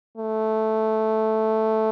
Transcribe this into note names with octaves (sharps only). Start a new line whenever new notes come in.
A3